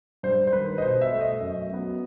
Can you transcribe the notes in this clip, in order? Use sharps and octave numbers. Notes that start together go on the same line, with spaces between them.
G2 C5
C5
D#3 G3 B4
D#5
B2 C5
E5
A3
D#5
F#2
F#3 B3